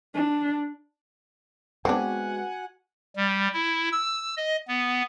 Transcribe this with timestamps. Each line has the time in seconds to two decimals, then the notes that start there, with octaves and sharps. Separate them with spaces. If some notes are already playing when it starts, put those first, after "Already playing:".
0.15 D4
1.85 G#3 B3 C4 D4 F#4 F#5 G#5
3.16 G3
3.54 E4
3.92 E6
4.37 D#5
4.68 B3